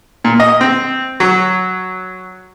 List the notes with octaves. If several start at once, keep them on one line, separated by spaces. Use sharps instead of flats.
A#2
D#5
C4
F#3